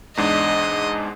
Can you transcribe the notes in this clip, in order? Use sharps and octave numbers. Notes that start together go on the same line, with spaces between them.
E2 G#2 D4 D#5